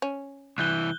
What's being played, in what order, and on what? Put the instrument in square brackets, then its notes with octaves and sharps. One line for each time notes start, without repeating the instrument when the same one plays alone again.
[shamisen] C#4
[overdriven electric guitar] C2 E3 [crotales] F#6 G6 G7